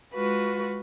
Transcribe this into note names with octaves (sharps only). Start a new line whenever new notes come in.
G#3 F4 F#4 B4